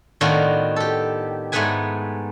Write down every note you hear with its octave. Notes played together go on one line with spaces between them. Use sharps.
A2 D#3 B3 D4 F4 F#4
G4 A4
G#2 A3 B3 G#4 B4 G#5